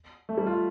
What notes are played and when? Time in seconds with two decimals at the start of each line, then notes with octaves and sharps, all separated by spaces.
0.29 A3
0.38 G3
0.47 F4